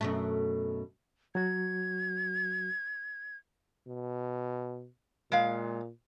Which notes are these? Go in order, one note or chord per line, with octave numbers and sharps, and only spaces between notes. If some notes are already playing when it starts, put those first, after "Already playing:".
F#2 B2 A3
F#3 F#4 G#6
B2
A#2 G#3 F5